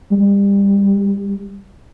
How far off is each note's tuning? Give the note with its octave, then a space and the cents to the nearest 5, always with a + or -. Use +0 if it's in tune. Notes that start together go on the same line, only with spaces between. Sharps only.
G3 +30